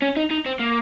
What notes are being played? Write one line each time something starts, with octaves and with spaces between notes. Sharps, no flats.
C#4
D#4
D#4
C4
A#3